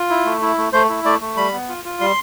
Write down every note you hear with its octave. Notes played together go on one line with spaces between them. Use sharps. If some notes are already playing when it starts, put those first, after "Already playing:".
Already playing: F4
E4
A3
E4
A3
A3 C5
E4
A3 D5
A3
G3 B5
B3
F4
F4
G3 C6